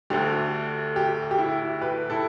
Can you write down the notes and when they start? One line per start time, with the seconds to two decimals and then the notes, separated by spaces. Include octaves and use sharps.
0.10 D2 D3 A3 G4
0.96 G4
1.31 G4
1.39 E4
1.81 G4 B4
2.10 E4 A4